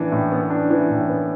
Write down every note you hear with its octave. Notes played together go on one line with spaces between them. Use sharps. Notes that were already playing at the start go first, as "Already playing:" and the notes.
Already playing: A2 E3 B3 D4
A2
B3
D4
E3
A2
B3